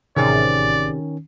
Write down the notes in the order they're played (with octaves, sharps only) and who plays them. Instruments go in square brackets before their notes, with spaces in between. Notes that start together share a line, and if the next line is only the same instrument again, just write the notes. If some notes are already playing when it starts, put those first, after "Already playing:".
[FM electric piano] A1 G#4 A6 [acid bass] C3 [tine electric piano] D#3 C#4 [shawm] D5